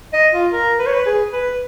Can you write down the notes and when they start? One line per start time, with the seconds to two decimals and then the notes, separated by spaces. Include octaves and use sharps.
0.13 D#5
0.33 F4
0.53 A#4
0.79 B4
0.87 C#5
0.94 B4
1.06 G#4
1.33 B4